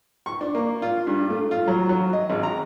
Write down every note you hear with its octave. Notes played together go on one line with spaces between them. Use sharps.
C#6
D4
A#3
F4
G2
A3
F4
F#3
F#3
D#5
G#1
A#5